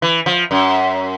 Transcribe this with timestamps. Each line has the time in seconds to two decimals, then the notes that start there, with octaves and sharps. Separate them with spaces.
0.02 E3
0.26 F3
0.51 F#2